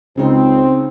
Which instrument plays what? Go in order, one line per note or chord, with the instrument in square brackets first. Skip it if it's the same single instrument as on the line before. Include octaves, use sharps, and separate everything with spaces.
[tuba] C#2 [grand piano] C#3 D#4 [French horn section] C4